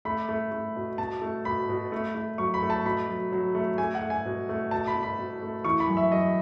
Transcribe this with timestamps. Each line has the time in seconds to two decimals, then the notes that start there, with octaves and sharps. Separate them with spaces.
0.05 A3 B5
0.29 A3
0.51 A3
0.76 B2
0.98 B2 A5
1.22 A3
1.45 B2 B5
1.69 B2
1.92 A3
2.15 A3
2.38 F#3 C#6
2.54 B5
2.63 A3
2.70 A5
2.86 B2 B5
3.08 F#3
3.32 F#3
3.55 A3
3.78 A3 G#5
3.95 F#5
4.01 A3
4.10 G#5
4.26 B2
4.49 A3
4.71 B2 A5
4.87 B5
4.95 B2
5.03 B5
5.19 B2
5.42 A3
5.64 E3 C#6
5.80 B5
5.88 F#2
5.97 E5
6.12 F#2 D#5